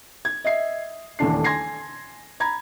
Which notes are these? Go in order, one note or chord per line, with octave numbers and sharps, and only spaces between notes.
G#6
D#5 E5 C7
D#1 E2 A3 D4 C7
G#5 C6 G#6 A#6 C7
A#5 B5 G#6